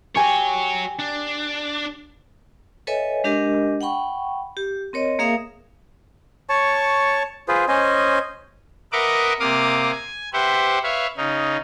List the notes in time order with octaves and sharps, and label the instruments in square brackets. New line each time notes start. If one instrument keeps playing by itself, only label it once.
[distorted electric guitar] F#4 C#5 [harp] G4 G#5
[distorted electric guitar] D4
[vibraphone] A4 B4 C#5 D#5 E5 G#5
G#3 D4 G4 A#4 D#5
F#5 G5 B5 C#6
G4
C4 A#4 C#5 D#5
A#3 G#4 A#4 E5 F5 D#6
[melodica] C#5 A5 C#6
F4 G#4 B4 C5
C#4 C5 D#5 G#5
[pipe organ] A#4 B4 D#5 E5 F#5 D6
C3 A#3 F5 D6 D#6
G#5
G4 B4 C5 E5 F#5
B4 C#5 E5 F5
C#3 D#4